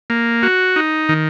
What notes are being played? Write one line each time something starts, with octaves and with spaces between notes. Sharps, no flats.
A#3
F#4
D#4
D#3